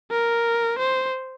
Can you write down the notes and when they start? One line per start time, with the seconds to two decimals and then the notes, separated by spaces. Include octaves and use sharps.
0.11 A#4
0.79 C5